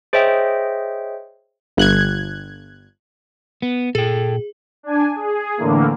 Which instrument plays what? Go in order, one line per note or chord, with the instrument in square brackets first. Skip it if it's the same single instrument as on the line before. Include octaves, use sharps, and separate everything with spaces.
[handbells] G#4 C5 C#5 D#5 E5 G5
[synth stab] G1 F#6 G#6
[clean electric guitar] B3
[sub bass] A#2 [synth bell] G#4 [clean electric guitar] A4 G5
[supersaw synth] D4 G#5
G#4
A2 D3 E3 A#3